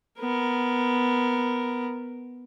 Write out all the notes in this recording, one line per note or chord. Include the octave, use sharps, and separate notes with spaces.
B3 A#4